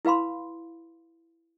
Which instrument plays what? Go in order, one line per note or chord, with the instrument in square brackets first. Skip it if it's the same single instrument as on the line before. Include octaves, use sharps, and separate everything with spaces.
[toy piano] E4 B4 F5 B5 C6